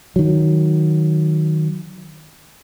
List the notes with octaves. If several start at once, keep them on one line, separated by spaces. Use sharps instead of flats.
D#3 F#3